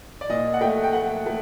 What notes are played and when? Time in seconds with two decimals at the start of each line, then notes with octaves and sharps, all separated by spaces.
0.21 D5
0.29 A#2 D#5
0.54 F#5
0.61 A3 G5
0.84 G5
0.93 A3 F#5
1.26 A3